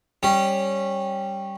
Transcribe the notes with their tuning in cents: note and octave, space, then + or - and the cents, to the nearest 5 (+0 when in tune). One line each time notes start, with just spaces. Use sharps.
G3 +0 C#4 -15 G4 +0